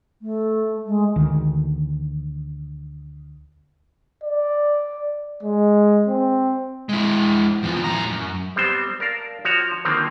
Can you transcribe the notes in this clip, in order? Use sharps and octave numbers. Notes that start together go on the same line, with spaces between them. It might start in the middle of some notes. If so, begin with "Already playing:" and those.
A3
G#3
D2 D#3
D5
G#3
C4
G#3 E4
E2 F3
A2 A#5
F#2
G3 B3 C4 C5
A#4 D5 F5 A5
F3 F#4 C#5
D3 D#3 F3 F#3 A#3 C4